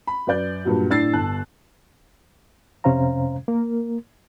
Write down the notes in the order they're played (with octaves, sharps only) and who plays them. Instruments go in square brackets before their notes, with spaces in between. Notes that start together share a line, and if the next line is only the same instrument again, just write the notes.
[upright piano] B5
F#2 B4 D5 G6
G2 A#2 F#3
A2 D4 E6 A6 C7
G1 A5 F#6
[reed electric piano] F2 C3 C#4 C5 F5 A#5
A#3 A#4